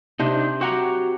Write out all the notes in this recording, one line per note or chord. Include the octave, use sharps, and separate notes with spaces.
C3 D4 D#4
F#4 G4 F#5 A#5